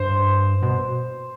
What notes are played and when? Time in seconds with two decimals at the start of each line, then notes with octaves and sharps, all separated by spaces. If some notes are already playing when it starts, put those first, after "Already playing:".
Already playing: G2 C5
0.62 B2